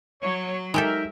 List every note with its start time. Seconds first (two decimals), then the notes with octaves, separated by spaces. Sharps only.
0.22 F#3 C#5
0.74 G#3 D#4 G4 A4 A#4 E5 G6